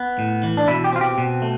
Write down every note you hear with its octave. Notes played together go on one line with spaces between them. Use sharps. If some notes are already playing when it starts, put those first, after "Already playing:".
Already playing: B3
A2
E3
D4
B2 E4
G4
C4 F4
G4
B2
A3